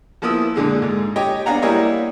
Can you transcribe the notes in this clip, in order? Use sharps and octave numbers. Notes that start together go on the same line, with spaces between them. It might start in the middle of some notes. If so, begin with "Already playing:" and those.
F3 A#3 B3 E4 D#6 E6
A#2 D3 G#3
G#2
G4 C#5 D#5 G5
B3 D4 F5 F#5 G#5 A#5
G3 A#3 E4 C#5 D#5